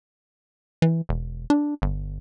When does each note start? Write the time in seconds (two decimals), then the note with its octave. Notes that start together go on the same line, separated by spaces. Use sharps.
0.82 E3
1.09 E1
1.50 D4
1.82 G1